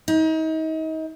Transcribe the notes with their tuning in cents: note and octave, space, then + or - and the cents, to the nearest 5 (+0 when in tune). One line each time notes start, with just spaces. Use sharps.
D#4 +35